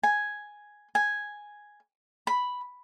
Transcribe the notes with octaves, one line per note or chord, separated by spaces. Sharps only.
G#5
G#5
B5